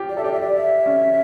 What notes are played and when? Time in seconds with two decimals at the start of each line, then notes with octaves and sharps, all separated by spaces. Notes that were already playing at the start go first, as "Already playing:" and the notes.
Already playing: F4 G4
0.09 D5
0.17 A4 E5
0.24 G4 D5
0.33 E5
0.40 D5
0.56 E5
0.86 C#4